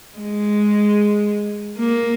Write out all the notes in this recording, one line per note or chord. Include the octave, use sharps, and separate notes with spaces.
G#3
A#3